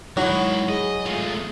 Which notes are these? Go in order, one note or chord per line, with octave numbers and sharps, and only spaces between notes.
F#3 G#3 D#4 E4 A#4
G#4 D#5
G#3 A3 F4